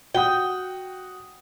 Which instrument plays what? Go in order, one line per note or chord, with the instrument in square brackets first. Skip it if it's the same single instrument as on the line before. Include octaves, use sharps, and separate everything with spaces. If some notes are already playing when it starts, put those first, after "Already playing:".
[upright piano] F#4 F#5 D#6 [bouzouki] G5